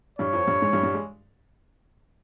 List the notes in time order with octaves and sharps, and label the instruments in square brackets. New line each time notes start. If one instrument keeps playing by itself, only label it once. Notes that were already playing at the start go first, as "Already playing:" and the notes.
[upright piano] G2 G3 [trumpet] C#5
[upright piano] F2 F3
G2 G3
G#2 G#3
G2 G3
G2 G3
G#3